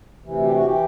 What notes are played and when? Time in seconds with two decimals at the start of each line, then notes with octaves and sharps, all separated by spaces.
0.25 D2 C3 E3
0.44 G4
0.55 F#4
0.64 E3 G4